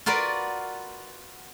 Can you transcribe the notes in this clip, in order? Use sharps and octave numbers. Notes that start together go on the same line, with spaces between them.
F4 F#4 A#4 B4 D5